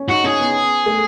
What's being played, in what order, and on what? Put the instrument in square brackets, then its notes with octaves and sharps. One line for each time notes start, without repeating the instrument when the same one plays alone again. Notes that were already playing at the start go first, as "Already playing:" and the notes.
Already playing: [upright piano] C#4
[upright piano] D#4 [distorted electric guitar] F#4
[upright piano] C#4 [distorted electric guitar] G#4
[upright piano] B3
A3